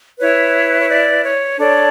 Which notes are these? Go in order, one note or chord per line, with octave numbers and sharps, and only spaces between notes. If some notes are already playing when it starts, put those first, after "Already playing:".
E4 B4 C#5
C#5
D5
C#5
D4 A4 C#5 D5